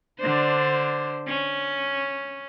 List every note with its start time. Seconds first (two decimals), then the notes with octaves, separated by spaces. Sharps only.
0.19 D3 D4 C5
1.27 C#4